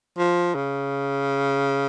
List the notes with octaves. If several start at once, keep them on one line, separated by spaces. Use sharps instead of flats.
F3
C#3